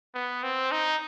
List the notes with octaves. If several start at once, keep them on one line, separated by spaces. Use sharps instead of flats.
B3
C4
D#4